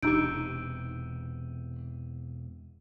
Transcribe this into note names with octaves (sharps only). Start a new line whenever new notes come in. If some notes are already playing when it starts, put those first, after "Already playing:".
E1 C3 D4 D#4 G4 E6 G6 D7